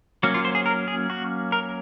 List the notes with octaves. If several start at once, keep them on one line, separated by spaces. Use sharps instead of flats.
F#3 A#3 C#4 F#4
F4
C5
G#4
A#4
G#4
F#4
A#4